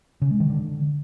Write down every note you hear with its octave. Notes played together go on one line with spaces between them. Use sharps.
C#3
G#3
D#3
D3